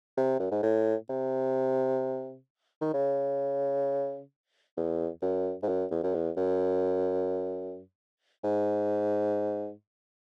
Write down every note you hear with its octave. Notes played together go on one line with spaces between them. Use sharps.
C3
F#2
G#2
A2
C3
D#3
C#3
E2
F#2
G#2
F#2
E2
F#2
E2
F#2
G#2